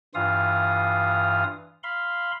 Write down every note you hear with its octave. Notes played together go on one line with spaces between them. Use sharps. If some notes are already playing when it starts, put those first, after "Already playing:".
G2 E3 F4 F5 D#6
F5 B5 C6